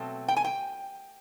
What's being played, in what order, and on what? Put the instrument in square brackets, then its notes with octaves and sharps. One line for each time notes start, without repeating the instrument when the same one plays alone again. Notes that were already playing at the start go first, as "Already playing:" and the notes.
Already playing: [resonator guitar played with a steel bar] B2 F#3 A3 C4
G5
G#5
G5